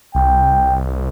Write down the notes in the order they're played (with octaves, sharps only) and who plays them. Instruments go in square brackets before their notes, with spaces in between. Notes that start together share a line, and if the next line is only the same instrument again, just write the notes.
[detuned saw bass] C2 [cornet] G5